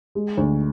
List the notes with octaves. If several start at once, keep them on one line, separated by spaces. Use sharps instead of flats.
G#3
D2